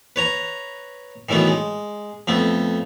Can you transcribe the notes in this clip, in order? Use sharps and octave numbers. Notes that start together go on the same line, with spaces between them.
B4 C#5 A#5
D#3 E3 F#3 A3 B3
G#3
F2 A3 B3